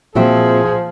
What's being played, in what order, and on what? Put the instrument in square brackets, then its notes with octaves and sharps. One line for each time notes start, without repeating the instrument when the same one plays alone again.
[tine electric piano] A#2 E5 [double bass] F3 [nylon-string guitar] C4 F#4 G5 [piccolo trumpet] G#4